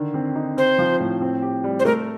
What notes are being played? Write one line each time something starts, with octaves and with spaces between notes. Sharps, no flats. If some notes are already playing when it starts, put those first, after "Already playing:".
Already playing: D3 D#3
C4
D#4
C4 C5
F3
A2
C4
G4
G3
C5
A3 A#4